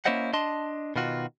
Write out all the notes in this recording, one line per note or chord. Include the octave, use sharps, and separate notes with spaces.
A#3 C#4 E4 C5 D#5 F#5
D4 D#5 A5 C6
B2 D#3 F4 F#4